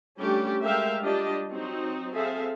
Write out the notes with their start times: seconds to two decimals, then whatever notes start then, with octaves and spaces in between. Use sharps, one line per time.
0.20 G3 A3 C#4 D4 G4
0.64 G#3 A3 A#4 E5 F5 G5
1.02 G3 D4 F4 G4 D#5
1.50 F#3 C4 D#4
2.16 C4 G#4 A4 E5 F5